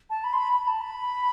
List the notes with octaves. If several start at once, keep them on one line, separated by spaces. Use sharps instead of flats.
A5
B5
C6
B5
B5
A5
B5